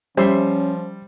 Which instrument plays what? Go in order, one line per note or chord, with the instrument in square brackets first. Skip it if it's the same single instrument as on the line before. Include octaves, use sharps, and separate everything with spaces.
[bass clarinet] F3 [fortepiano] G3 [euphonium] C#4 [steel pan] C5 E5 C6